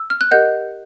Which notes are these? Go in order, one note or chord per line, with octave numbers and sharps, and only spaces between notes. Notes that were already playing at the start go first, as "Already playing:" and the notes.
Already playing: E6
F6
F#6
G4 A#4 D#5 F#5 G6